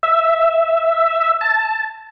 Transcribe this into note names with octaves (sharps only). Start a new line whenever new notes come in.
E5
A5